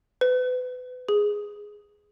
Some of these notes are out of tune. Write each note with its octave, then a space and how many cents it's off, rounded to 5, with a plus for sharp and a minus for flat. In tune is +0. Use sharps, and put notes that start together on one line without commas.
B4 +30
G#4 +0